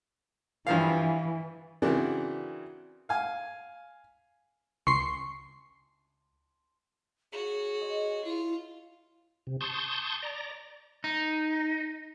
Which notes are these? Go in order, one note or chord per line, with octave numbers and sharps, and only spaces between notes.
G2 E3 F3 F5
C#3 E3 C4 D4 F#4 A#4
F5 G#5
C#2 C6 C#6 C7
F#4 G#4 C#5
C5 D#5
E4 F4
C3
A5 C6 C#6 D#6 G6
D5 A#5
D#4